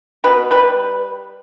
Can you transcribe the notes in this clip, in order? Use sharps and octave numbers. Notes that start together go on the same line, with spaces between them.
B2 B4
G3 B4